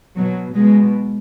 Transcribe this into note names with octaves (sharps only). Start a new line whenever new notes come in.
B2 F#3
B2 G#3